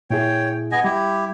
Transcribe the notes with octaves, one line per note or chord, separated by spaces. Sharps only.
A#2 E4 G#4 C#5 G5
B3 D#5 G#5
G3 E4 G4